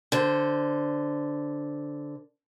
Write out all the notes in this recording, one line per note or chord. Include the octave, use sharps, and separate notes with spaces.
D3 C5